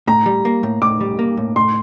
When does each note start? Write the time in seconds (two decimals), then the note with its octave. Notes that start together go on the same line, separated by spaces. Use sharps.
0.07 A2 A#5
0.26 G3
0.45 A#3
0.63 A2
0.82 A2 D6
1.01 G3
1.19 A#3
1.37 A2
1.56 A2 C6